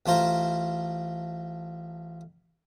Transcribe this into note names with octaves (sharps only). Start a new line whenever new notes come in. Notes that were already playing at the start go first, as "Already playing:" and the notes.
A1 A3 F4 C5 A#5